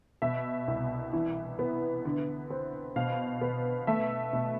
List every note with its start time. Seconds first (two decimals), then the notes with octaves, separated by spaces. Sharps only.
0.22 B2 E5
0.68 C2
1.13 E3
1.59 B3
2.05 D3
2.50 C4
2.96 B2 F5
3.41 B3
3.87 A3 E5
4.33 B2